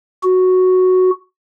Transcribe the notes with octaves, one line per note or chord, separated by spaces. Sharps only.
F#4